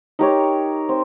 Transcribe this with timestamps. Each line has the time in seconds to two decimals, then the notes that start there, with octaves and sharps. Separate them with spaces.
0.19 D#4 G4 A#4 C#5
0.89 C4